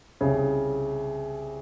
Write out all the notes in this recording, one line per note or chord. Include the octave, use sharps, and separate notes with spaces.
C2 C#3